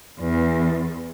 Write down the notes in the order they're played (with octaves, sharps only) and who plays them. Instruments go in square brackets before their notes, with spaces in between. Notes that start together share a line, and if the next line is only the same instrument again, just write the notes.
[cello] E2 [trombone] E3